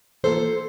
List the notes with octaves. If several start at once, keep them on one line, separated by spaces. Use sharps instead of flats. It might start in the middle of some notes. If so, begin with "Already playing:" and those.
E3 A#3 F4 A4 C5